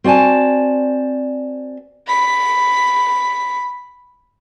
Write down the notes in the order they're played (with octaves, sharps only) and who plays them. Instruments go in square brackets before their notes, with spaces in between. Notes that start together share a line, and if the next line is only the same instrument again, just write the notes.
[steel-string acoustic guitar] C4 F#4 D5 G#5 A5
[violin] B5 B6